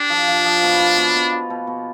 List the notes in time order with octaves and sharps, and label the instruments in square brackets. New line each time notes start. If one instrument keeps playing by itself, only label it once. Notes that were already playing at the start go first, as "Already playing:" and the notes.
Already playing: [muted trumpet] D4 [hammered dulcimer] G4
[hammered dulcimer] F3
F3
F3
B2
F4
B2
B2
F4
B2
B2